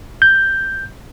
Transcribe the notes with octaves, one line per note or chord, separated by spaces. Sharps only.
G6